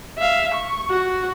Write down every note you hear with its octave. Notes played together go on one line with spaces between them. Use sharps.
E5 F5
C#6
F#4